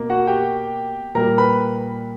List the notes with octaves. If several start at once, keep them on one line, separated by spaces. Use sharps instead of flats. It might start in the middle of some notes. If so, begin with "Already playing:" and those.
Already playing: B2 A#3
F#4 F#5
G4 G5
A#2 G3 A#3 A#4 A#5
B4 B5